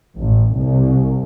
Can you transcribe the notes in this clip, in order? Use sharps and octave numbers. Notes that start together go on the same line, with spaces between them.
A1
C2